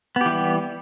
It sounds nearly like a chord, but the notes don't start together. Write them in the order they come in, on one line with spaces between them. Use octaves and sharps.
B3 G4 E3 G3